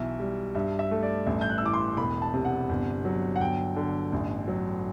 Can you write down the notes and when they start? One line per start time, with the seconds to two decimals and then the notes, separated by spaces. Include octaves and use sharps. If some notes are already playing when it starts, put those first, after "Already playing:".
Already playing: B1 E3 E5
0.20 G3
0.55 G2 E5
0.79 E5
0.91 A3
1.03 D5
1.27 A1 E5
1.41 G6
1.49 F#6
1.58 E6
1.62 E3 D6
1.74 C6
1.97 E1 B5
2.22 A5
2.33 C3
2.45 F#5
2.69 G1
3.05 F#3
3.36 F#5
3.40 G1 G5
3.76 D3
4.12 A1
4.48 F#3